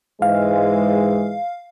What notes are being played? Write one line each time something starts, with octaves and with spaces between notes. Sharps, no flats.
G#2 E3 G#3 F5